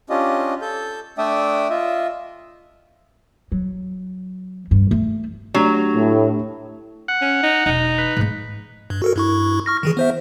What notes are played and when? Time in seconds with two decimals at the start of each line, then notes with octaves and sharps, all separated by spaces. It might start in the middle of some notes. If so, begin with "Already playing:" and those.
0.10 C#4 D4 F4 G4 D#5
0.61 A4 G6
1.18 A3 D4 D5 E5 G5 D#6
1.70 F4 D#5 E5
3.52 F#3
4.71 G2
4.91 A3
5.54 F#3 A3 D4 G4
5.94 A2
7.08 F#5
7.22 C#4
7.43 D#4
7.66 E1 D#4
7.98 B4
8.17 G#2 A#3
8.90 G2
9.02 F#4 A4 A#4
9.16 G2 E4 C#6
9.66 C#6 F6 A#6
9.83 D#3 E3 G#4
9.97 B3 C5 E5